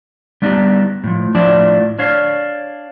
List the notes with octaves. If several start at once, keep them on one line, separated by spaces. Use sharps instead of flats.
G3 B3 D4 D#4 G4
A2 F3
A2 F3 D4 E4 D5 A5
D4 C#5 F5